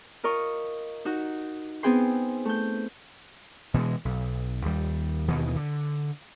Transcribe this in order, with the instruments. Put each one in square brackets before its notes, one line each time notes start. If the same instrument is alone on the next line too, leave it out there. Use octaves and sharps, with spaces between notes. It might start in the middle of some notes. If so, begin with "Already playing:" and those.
[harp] F4 A#4 D#5 C#6
D#4 F#4
B3 C4 G#4 G5 C6
A3 G6
[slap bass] B2 E3 F#3 G#3
B1
D#2 G3
D#2 B2 D#3 E3
D3